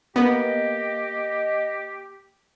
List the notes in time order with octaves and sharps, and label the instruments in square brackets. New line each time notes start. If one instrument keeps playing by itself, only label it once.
[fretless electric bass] A#3 [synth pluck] B3 [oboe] G4 [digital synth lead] D#5